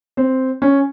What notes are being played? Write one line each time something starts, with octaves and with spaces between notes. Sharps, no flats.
C4
C#4